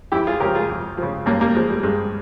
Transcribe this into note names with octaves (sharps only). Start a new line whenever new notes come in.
F2 E4 G4
F4 G#4
C#3 F3 G4 A#4
F4 G#4
F2
C#3 F3
G2 A#3 C#4
G3 A#3
F3 G#3
G3
G2 G#3